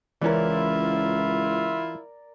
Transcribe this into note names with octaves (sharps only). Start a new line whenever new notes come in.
C#2 E3 C#4 E4 F4 A#4 D5